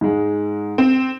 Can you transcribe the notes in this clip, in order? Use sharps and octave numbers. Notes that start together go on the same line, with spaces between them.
G#2 G#3
C4